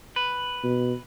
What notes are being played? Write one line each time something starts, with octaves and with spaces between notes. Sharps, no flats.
B4
B2